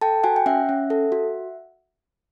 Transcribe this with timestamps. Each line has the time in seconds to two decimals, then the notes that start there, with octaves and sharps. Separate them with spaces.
0.01 A4 G5 A5
0.24 F#4 F#5 G#5
0.36 G5
0.46 C#4 E5 F#5
0.69 C#4
0.90 A4
1.12 F#4